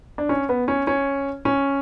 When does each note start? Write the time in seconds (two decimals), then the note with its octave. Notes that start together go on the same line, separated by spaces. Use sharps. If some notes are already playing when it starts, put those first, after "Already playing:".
0.18 D4
0.29 C#4
0.49 B3
0.68 C#4
0.87 C#4
1.45 C#4